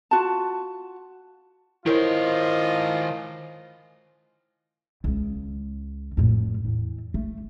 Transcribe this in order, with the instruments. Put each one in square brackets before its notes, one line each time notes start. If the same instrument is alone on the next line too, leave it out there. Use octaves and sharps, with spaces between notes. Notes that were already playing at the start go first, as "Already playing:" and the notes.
[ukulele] F4 F#4 A5
[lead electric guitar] D#3 C5 [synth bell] E4 A#4 C#5 [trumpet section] F4 D#5
[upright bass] C#2 C#3
F2 A2
E2
A3